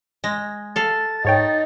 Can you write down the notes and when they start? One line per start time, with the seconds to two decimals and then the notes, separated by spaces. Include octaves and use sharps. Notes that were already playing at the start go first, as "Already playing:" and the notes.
0.24 G#3 A#6
0.76 A4 F5 A6
1.25 G#2 D#4 C#5 G5